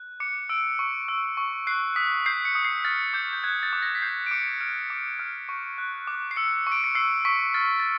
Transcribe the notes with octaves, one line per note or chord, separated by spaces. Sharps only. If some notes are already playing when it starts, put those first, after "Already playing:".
Already playing: F#6
D6 C#7
E6 D7
C#6
E6
C#6
F#6 C7
D#6 B6
G6 C7
C#7
D#6
C7
F6 A6
D6 G6
G6
F#6 G#6
A6
D6
A#6
B6
G6 C7
D7
D6 C#7
F6 D7
D6
F6
C#6
F#6
D6
C7
E6 C#7
C#6
D7
C#7
E6 C7
C#6 B6
F6 A6
A6